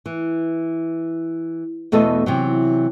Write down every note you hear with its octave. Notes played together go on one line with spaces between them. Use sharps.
E3
E2 B2 A3 A4 D#5
C3 E3 F#3